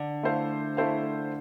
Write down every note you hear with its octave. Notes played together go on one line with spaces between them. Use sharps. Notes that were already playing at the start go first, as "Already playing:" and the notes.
Already playing: D3
A3 E4 A4 C5 F5
A3 E4 A4 C5 F5